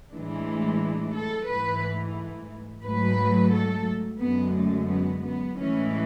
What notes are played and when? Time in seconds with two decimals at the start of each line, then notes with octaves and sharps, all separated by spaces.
0.13 A2 E3 G#3 D4
1.16 A4
1.49 G#2 E3 A3 B4
2.85 G#2 F#3 A3 B4
3.53 A4
4.21 F#2 D3 G#3 B3
4.56 A3
4.90 B3
5.23 B3
5.57 A2 E3 G#3 C#4